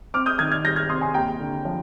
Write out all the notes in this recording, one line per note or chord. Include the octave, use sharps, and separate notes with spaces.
C4 D6 F6
D#6 G6
D#3 F6 G#6
F6 G#6
G3 G6 A#6
F6 G#6
C3 C6 D#6
G#5 C6
D#2 G5 A#5
D3
F3